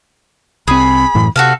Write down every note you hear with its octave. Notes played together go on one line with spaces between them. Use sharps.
C2 C4 G#4 B5 D#6
F#2 A2 E3
C3 F#4 A4 F5